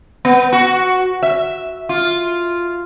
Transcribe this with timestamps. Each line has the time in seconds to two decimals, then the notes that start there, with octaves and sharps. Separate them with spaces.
0.25 B3
0.52 F#4
1.23 E5
1.89 F4